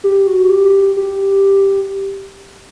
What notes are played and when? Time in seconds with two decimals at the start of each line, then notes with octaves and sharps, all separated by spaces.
0.04 G4
0.27 F#4
0.50 G4
0.97 G4